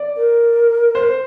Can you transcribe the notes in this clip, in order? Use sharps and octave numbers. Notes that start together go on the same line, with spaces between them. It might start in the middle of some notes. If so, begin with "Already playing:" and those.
Already playing: D5
A#4
C5